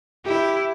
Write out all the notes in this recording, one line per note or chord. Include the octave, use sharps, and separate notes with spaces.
E4 G4